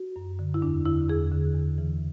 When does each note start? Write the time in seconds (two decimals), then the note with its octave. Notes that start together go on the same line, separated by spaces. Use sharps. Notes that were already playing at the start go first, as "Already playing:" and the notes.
Already playing: F#4
0.16 F#2
0.39 D3
0.54 E4
0.62 E2 D4
0.85 D3 E4
1.08 E2 G#4
1.32 D3
1.54 E2
1.78 C#3 E3